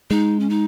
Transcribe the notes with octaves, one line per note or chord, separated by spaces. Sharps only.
G#3 D#4
C#4
D#4